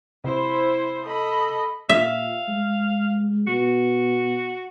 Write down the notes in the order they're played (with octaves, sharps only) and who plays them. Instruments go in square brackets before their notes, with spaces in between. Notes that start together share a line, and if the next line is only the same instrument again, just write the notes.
[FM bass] C3 [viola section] E4 C5
[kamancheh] A4 D#5 [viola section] B5
[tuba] A#2 [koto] E5 [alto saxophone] F5
[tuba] G#3
[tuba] B2 [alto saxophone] F#4